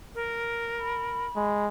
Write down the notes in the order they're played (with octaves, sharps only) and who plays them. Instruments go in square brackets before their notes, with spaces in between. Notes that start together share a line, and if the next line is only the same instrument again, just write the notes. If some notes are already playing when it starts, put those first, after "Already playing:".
[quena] A#4
[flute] B5
[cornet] G#3